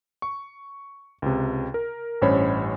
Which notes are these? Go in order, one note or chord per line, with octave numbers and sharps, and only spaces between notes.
C#6
C#2 C3
A#4
A1 G2 C#4 C5 C#5 B5